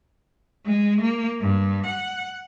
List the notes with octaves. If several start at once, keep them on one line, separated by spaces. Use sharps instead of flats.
G#3
A#3
G2
F#5